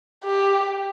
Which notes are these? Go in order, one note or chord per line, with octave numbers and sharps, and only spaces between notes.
G4